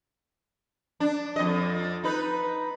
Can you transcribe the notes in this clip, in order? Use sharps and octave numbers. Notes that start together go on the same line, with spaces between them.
D4
F2 D#5
D#4 B4